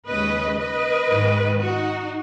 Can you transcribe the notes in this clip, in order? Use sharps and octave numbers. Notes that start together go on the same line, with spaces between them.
D#2 C#3 G#3 B4 D#5
B4 D#5
G#2 D#3 G#3
D#4 F#4